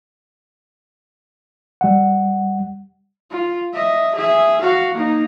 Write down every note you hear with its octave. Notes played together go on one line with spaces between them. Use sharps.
G3 F#5
F4
D#5 E5
G#4 E5
F#4 F5
A#3 D#4